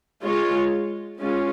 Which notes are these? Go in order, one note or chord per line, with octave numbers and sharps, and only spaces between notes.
G#3 F4 C#5
G#3 C#4 F4